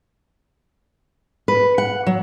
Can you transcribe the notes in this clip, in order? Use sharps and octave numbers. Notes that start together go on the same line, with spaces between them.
B4
F#5
F#3